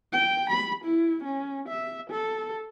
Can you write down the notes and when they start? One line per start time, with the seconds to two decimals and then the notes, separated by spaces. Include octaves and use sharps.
0.13 G5
0.50 B5
0.85 E4
1.24 C#4
1.69 E5
2.10 A4